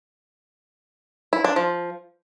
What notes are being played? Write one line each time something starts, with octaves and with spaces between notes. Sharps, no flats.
E4
D4
F3